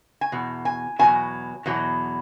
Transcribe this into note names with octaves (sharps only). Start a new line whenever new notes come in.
G#5
E2 B2
G#5
E2 B2 F#3 G#5
E2 B2 F#3